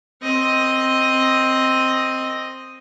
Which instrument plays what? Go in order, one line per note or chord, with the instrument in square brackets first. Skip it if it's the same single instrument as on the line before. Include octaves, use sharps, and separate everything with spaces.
[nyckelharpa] C4 D#5